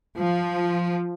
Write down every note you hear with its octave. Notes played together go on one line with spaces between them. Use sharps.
F3